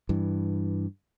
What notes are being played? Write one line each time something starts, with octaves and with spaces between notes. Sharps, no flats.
G2 E3